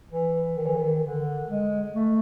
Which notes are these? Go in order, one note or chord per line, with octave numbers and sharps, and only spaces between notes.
E3
D#3
E3
D#3
D3
G#3
A3